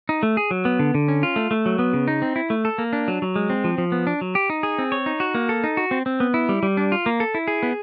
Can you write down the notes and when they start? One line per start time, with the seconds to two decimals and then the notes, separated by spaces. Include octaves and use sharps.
0.09 D#4
0.23 A3
0.37 G#4
0.51 F#3
0.65 B3
0.79 D3
0.95 D3
1.08 C#4
1.23 F4
1.36 A3
1.51 A3
1.66 F#3
1.79 B3
1.93 C#3
2.08 D#4
2.22 C4
2.36 E4
2.50 A3
2.65 A4
2.78 A#3
2.93 D4
3.08 F#3
3.22 F#3
3.36 G#3
3.50 C4
3.64 F3
3.78 F3
3.92 B3
4.07 D4
4.21 F#3
4.35 G4
4.50 D#4
4.63 G#4
4.79 C4
4.92 C#5
5.06 D#4
5.20 F#4
5.35 A#3
5.49 A4
5.64 D#4
5.77 F#4
5.91 C4
6.06 C4
6.20 B3
6.34 E4
6.49 G3
6.63 G3
6.77 D4
6.92 F4
7.06 A#3
7.20 A4
7.35 E4
7.48 G#4
7.63 B3